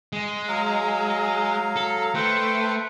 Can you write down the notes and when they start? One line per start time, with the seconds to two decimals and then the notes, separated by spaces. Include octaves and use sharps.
0.13 G#3
0.48 F#3 F5 A#5
1.76 A4
2.15 A3 B4 C5 G5